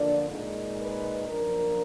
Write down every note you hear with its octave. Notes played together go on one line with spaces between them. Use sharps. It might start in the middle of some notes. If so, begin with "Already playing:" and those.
Already playing: D3 F3 A#3 D4 D5
A#2 G#3 D#4
B4
F#2 F3 A#3 D4 A#4